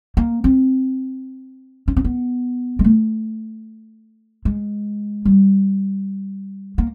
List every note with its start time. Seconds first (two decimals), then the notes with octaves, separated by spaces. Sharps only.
0.17 A#3
0.44 C4
1.88 C#4
1.97 C4
2.04 B3
2.79 G#3
2.84 A3
4.45 G#3
5.25 G3
6.78 A#3